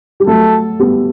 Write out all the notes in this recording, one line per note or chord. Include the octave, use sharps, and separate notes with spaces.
G3
F#3 A3 A4
G3 B3